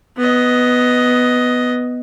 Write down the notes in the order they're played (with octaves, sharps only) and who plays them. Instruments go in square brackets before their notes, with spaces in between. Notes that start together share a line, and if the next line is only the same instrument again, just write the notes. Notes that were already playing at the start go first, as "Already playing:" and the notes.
[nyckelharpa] B3 D#5